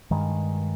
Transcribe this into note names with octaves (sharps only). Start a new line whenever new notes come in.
G2 D#3 G#3